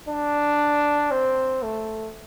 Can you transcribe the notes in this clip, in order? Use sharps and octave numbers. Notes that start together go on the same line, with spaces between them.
D4
C4
A3